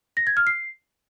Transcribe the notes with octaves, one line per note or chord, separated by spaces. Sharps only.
A#6
G#6
F6
C7